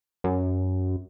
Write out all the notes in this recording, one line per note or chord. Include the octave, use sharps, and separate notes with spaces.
F#2